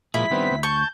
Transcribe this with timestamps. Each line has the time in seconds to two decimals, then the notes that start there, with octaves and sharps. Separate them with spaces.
0.14 A#2 F3 G#3 E4 G#4 B6
0.31 D#3 G3 B3 C4 D4
0.51 D2
0.63 A5 C#6 G6